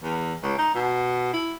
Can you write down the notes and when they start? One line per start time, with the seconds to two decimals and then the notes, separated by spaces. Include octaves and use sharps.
0.03 E2
0.43 C#2
0.58 D#4
0.75 B2
1.33 E4